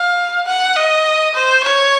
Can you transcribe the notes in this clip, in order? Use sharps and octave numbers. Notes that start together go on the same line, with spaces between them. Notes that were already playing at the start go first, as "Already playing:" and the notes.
Already playing: F5
F#5
D#5
C5
C#5